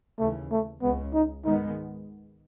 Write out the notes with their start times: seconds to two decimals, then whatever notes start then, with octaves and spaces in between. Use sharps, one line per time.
0.19 D#2 C#3 E3 A3
0.51 A3
0.82 C#2 C#3 G#3 B3
1.13 D#4
1.45 G#2 D#3 G#3 B3 D#4